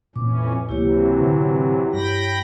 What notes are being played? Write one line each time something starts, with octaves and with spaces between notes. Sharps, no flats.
F2 A#2 E3 C#4 D6
C#2 C3 E3 F#3 A#3 E4 G4 C#5
A1 D3
G2 G5 B5 A#6